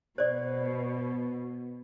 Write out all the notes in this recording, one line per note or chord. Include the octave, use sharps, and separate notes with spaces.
B2 C5 D5